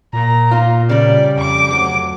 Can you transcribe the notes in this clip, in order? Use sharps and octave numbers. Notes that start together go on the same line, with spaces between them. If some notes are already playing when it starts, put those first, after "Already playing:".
A#2 A#5
A#3 D#4 F4
C#3 G3 D5
F2 D6
D2 F#3